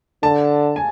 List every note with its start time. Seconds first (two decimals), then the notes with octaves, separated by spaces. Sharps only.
0.23 D3 A5
0.76 G#5